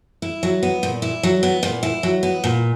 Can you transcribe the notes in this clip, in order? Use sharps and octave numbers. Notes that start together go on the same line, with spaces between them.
E4
F#3
B3
A#2
E4
F#3
B3
A#2
E4
F#3
B3
A#2